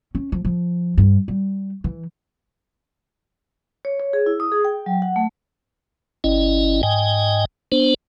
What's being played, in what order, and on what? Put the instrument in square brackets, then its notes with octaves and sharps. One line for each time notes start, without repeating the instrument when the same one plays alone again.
[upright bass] C#4
F3
F3
G2
G3
E3
[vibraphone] C#5
C#5
G#4
E4
D#6
G#4
G5
F#3
F#5
A3
[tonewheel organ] G1 C#4 E4 D#5
G#2 D#5 G5 G#5
B3 D4 C5